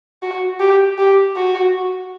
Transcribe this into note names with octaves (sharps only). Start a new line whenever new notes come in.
F#4
G4
G4
F#4